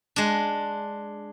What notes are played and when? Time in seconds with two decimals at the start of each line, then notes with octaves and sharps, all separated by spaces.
0.16 G#3 D4